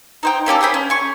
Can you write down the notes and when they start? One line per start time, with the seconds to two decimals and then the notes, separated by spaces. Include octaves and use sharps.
0.23 D#4 C5 G5
0.46 A#3 C#4 G4 A4
0.61 G#4 A#4 C5 B5
0.74 C#4
0.90 G#5 C#6